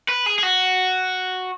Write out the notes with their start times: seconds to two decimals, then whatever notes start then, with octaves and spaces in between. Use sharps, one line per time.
0.09 B4
0.26 G#4
0.39 G#4
0.43 F#4